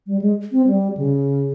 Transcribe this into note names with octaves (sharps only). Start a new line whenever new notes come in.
G3
G#3
C4
G3
C#3